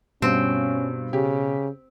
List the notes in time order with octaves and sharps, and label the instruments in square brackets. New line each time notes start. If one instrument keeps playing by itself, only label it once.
[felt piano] G2 [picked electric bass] B2 [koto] C4 [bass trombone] C#4
[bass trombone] C#3 [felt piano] G4